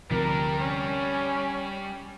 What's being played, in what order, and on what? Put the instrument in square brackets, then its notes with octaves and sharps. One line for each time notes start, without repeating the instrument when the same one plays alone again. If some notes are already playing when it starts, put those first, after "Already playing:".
[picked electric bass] D2 C3 F3 [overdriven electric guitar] G3 D4 [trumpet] A#4
[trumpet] C#4